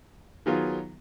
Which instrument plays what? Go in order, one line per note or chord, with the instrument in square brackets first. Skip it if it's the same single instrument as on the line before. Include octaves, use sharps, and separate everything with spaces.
[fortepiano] D#3 F#3 B3 F4 G#4